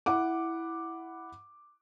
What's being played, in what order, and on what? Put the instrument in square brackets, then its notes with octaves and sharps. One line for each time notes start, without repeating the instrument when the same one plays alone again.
[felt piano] E4 F#5 D6